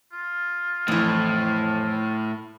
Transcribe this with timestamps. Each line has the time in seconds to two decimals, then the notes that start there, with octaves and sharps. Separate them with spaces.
0.12 F4
0.88 F2 A2 E3